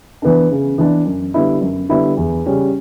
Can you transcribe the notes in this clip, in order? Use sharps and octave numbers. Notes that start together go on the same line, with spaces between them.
E3 B3 D4
C#3
E3 B3 D4
F#2
D3 G3 B3 E4
F#2
D3 G3 B3 E4
E2
C#3 G3 C#4